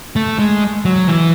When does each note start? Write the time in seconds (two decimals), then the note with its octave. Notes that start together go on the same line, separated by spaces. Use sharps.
0.16 A3
0.39 G#3
0.85 F#3
1.08 E3